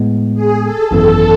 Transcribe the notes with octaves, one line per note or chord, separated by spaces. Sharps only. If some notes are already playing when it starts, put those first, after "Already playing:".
Already playing: A2 G#3 B3
G#4
A4
G#1 F#2 E3 B3 A4